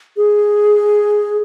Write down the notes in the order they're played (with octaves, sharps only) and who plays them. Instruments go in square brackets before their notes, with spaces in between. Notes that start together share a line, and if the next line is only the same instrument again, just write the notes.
[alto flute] G#4